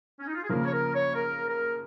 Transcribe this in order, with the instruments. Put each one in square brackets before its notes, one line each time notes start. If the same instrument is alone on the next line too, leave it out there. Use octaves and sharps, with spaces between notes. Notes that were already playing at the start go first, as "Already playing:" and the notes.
[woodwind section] C#4
D#4
F4
G#4
[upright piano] C#3 F3 A#3 [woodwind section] A#4
[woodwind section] C#5
A#4
C#5
A#4
A#4